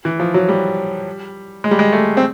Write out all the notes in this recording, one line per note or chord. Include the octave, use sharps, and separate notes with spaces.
E3
F3
F#3
G3
G#3
G3
G#3
A3
C4